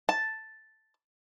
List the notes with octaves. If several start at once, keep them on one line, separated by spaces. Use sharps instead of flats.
A5